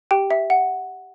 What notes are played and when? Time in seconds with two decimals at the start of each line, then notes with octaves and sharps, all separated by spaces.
0.11 G4 G5
0.30 E5
0.50 F#5